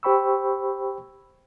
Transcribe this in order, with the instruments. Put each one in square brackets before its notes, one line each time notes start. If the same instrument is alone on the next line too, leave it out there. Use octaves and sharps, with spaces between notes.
[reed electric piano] G4 C5 G5 B5 C#6 E6